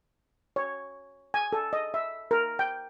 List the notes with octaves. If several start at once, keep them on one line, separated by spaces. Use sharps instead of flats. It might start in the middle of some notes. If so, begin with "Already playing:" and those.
C#5
G#5
A4
D#5
E5
A#4
G5